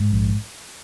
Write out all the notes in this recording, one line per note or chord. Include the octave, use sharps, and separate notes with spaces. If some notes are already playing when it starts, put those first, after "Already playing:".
Already playing: G#2
A#1